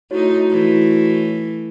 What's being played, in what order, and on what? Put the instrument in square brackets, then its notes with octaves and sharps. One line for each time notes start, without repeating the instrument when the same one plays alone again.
[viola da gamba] A3 D#4 [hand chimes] E4 F#4 C#5
[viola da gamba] E3 A3